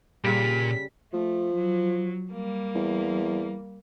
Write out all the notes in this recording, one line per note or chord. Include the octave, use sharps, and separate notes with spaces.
A#2 C#3 G3 B6
F3 A3
F#3
G3 A#3
E2